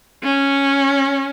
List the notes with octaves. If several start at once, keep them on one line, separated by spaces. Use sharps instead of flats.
C#4